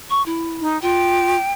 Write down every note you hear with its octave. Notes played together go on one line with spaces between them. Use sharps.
C#6
E4
D#4
F4 G5